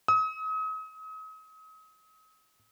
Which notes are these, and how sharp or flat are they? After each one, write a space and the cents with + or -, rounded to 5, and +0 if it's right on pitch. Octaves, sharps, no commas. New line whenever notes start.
D#6 +40